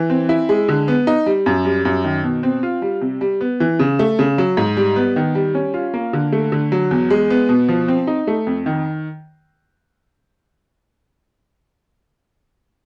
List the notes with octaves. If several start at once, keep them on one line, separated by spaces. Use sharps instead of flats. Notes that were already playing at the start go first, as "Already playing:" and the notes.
Already playing: E3
C4
E4
G#3
D3
B3
D#4
G3
F#2
G3
F#2
D#3
B2
C4
F4
G3
C3
G3
B3
E3
C#3
A3
C#3
F#3
G#2
G3
B3
D#3
G3
C#4
F4
A#3
D3
A3
D3
F#3
E2
G#3
B3
B2
F3
C4
D#4
A3
F2
D#3